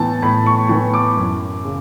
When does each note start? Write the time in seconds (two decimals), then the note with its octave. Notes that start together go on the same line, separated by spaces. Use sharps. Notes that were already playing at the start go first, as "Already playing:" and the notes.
Already playing: A2 E3 B3 A5
0.22 A2 B5
0.46 C#6
0.69 E3 B3 C#6
0.94 D6
1.17 F#2
1.64 C#3